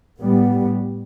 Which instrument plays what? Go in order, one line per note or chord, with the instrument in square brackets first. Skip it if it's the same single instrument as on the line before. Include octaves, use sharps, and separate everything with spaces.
[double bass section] A2 G3 B3